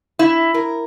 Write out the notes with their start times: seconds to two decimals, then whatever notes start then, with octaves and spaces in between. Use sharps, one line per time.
0.19 E4
0.54 A#4